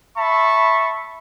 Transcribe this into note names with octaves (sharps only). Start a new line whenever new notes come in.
E5 A5 B5 C#6